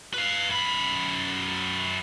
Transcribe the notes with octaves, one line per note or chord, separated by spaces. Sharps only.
B4 F5
F#2 B5